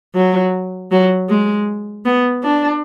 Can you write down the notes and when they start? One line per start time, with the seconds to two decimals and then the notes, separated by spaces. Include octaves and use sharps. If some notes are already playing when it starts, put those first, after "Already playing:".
0.15 F#3
0.91 F#3
1.29 G#3
2.05 B3
2.43 D4